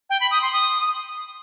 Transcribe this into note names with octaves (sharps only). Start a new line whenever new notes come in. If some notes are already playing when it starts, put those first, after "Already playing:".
G5
B5
D#6
C6
D#6